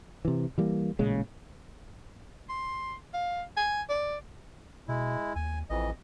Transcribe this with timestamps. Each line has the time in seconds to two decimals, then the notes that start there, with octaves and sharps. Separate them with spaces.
0.25 C3 E3
0.58 E3 G3 A#3
0.99 A1 A#2 C#3 G#3
2.49 C6
3.14 F5
3.57 G#5
3.89 D5
4.88 B2 G#3 E4
5.35 D#2 G#5
5.70 A1 F2 E3 D#5